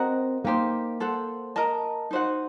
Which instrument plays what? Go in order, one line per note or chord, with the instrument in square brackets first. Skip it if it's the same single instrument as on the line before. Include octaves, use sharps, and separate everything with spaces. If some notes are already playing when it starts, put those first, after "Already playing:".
Already playing: [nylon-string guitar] C4 [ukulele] F#4 A#4 D#5 F#5
[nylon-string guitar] A#3 [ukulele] D#4 G4 C5
[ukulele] A4 C5 F#5
A#4 D#5 A5
D#4 F#4 C5 F#5